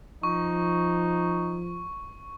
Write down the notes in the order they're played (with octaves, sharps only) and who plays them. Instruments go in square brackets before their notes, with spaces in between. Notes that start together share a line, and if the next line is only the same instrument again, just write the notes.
[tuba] F3 [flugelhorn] D#4 [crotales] C#6